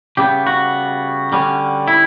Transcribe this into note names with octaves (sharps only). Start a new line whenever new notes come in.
C#3 G3 B3 G4
F#4
D3 G3 C#4
E4